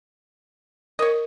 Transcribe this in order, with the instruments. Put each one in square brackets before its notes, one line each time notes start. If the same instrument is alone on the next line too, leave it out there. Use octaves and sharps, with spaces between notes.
[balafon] A#4 [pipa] C#5 D#5